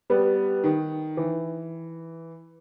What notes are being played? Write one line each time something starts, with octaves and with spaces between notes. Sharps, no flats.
G3 B3
D#3
E3